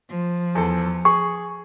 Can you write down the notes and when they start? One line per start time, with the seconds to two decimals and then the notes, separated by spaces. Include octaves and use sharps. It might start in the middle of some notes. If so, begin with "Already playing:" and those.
0.11 F3
0.55 E2 A4
1.05 G#4 C#6